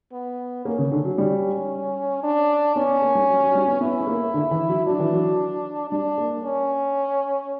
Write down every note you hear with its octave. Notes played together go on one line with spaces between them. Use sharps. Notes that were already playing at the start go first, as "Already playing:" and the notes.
B3
A#3 C#4
C#3
D3
F#3
G3
D4
B3 C#4
B3
A#3
G3
F#3
F#3
G3
B3
B3 E4
B3
A#3
D3
E3
F#3
F#3 D4
E3
F#3
G3 D4
A#3
C#4